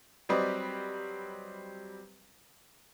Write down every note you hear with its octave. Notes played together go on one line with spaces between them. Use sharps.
F#3 G3 C4 B4 D5 D#5